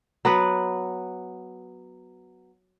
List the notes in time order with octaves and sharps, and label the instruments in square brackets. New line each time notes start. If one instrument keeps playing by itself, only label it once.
[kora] F#3 B3 B4